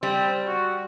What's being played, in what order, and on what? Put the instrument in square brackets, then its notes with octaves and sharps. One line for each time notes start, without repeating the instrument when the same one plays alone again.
[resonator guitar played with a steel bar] G3 [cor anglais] C4
[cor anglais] F#4